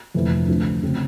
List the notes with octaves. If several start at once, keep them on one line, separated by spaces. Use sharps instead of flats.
G1 F2 C3 E3 A3
D2 D3 F3 A3
C#3 F#3 A3 C4